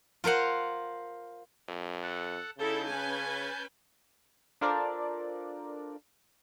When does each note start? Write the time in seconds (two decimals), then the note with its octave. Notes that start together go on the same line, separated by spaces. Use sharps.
0.24 F4 A#4 C5 F#5
1.69 F2
2.02 A4 F#5
2.58 C#3 D#4 E4 A4 A5 G6
2.87 C#4 B4 G#5
4.61 D4 F4 A4 A#4 C5 D5